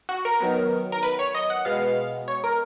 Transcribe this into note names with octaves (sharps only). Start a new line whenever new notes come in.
F#4
A#4
D#3 F#3 B3
A#4
B4
C#5
D#5
F#5
B2 G#3 B3 F5
C#5
A#4